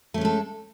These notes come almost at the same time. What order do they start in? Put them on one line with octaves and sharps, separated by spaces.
A3 C#4 G#3 A4